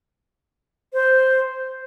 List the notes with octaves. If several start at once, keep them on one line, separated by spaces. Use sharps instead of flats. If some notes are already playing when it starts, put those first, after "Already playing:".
C5